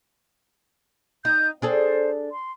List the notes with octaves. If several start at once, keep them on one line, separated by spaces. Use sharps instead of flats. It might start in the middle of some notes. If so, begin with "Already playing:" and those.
D#4 G6
D4 G#4 A4 C5
C6